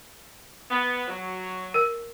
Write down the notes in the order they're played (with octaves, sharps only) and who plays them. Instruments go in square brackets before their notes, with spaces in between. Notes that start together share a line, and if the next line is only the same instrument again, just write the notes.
[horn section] B3
F#3
[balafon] A#4